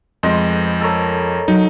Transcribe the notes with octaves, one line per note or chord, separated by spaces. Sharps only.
F2 G#3 B4 C5 D#5
A4 A#4 C#5
F#3 D#4